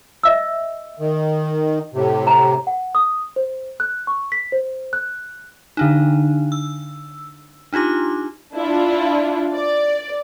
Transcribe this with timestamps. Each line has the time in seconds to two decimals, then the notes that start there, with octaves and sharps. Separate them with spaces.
0.23 D#5 E5 E6
0.99 D#3
1.94 A2 C3
2.27 A#5
2.67 F#5
2.95 D#6
3.36 C5
3.80 F#6
4.07 C#6
4.32 B6
4.52 C5
4.93 F#6
5.77 D3 D4 D#4
6.52 E6
7.73 D4 D#4 F4 G4 D6
8.55 D4 E4 F4
9.53 D5